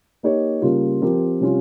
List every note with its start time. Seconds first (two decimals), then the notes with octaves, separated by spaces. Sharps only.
0.23 A#3 D#4 G4 C#5
0.62 C#3 G3 A#3 F4
1.02 F3 C4 G4 A#4
1.41 C3 G3 C#4 F4